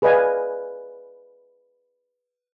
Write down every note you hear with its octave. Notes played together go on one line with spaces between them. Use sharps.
G#4 B4 D5 D#5 F5 G#5